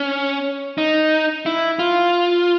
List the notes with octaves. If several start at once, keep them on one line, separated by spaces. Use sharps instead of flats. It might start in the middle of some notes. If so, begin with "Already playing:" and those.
Already playing: C#4
D#4
E4
F4